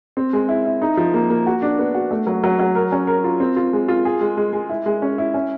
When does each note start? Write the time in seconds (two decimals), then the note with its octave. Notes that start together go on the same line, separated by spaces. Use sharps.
0.17 C4
0.33 G#3
0.49 E4
0.65 E4
0.82 D#4
0.97 F3
1.14 A#3
1.30 A#3
1.46 F#4
1.62 D4
1.78 B3
1.95 F#4
2.11 A3
2.27 F#3
2.44 F#3
2.59 F#3
2.75 A#4
2.92 C#4
3.07 A#4
3.24 F4
3.40 C4
3.56 F4
3.73 G#3
3.88 F4
4.05 G#4
4.21 G#3
4.37 G#3
4.53 G#3
4.69 E4
4.86 G#3
5.02 C#4
5.18 E4
5.34 C#4